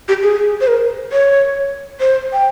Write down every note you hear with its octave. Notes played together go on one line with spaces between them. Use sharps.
G4
G#4
C5
A#4
C#5
C5
G5